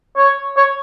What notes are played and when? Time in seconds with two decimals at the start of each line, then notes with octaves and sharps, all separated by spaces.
0.17 C#5
0.57 C#5